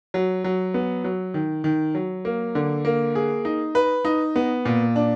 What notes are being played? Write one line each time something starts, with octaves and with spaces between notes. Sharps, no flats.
F#3
F#3
B3
F#3
D#3
D#3
F#3
A#3
D3
A#3
G#4
D#4
B4
D#4
B3
A#2
D4